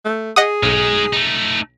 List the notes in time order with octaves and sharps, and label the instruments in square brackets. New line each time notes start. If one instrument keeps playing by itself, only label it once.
[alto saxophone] A3
[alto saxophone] G#4 [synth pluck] D#5 F#5 D#6
[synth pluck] B1 [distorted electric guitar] G#3 D#4
[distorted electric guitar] A3 D#4